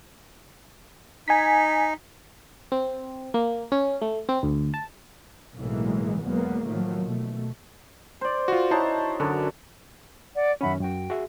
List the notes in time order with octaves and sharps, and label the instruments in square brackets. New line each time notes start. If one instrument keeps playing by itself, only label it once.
[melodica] D#4 [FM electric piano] G#5 B6
[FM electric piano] C4
A#3
C#4
A3
C4
D2
A5
[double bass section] B1 A2 E3 F#3 G#3 A#3
E2 F#3 G#3 A#3 B3
A2 D#3 F3 F#3 A3 A#3
B2 A3
[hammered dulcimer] C5 D5
[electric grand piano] F4 F#4
[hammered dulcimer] D#4 F#4 C#5 [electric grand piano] E4 C5 A5
[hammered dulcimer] F#2 D4 [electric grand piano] D3
[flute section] D5 F#5
[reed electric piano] F#2 D#3 C#4 [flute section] E5 F#5 B5
[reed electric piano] F#2 F#4 [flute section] G5
[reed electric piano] F#4 G#4 E5